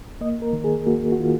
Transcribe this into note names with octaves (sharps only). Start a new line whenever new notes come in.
A#3 D#5
A#4
D#3
G#4
A#3 F#4
F#4
D#3 F4